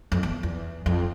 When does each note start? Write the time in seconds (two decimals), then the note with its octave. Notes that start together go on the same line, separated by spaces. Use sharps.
0.12 F2
0.23 E2
0.43 E2
0.86 F2